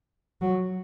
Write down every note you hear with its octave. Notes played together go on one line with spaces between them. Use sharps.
F#3